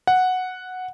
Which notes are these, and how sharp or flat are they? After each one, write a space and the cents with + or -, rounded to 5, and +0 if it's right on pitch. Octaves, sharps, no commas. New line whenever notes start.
F#5 -5